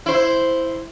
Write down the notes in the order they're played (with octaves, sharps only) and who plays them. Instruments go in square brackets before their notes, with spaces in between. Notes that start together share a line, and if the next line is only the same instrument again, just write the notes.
[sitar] E4 C5